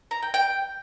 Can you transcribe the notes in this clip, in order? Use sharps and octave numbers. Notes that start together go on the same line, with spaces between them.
A#5
G5
G5